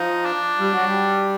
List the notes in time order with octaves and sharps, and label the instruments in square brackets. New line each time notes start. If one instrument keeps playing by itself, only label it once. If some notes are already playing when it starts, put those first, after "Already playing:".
Already playing: [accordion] F3 [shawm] D#4
[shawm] D4
[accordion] G3
F#3
G3